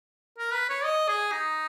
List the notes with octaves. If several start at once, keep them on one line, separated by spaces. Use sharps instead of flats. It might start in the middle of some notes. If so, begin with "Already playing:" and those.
A#4
B4
C#5
D#5
G#4
D#4